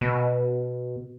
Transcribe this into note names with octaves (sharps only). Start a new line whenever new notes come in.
B2